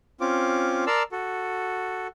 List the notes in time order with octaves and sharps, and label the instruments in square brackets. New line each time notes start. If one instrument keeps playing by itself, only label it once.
[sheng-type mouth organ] C4 C#4 F4 D6
A#4 D5 A5 A#5 C6 E6
F#4 A4